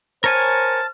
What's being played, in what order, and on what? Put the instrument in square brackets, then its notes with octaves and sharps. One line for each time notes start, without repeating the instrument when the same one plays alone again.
[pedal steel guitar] A#4 C#5 G#5 [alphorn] C5 [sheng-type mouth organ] A5 [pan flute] F6